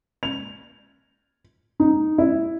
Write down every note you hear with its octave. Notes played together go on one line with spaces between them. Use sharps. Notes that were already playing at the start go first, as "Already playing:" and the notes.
F7
D#4
E4